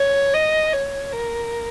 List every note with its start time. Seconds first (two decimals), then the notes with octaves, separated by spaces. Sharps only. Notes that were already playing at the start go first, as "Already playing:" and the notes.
Already playing: C#5
0.34 D#5
0.73 C#5
1.12 A#4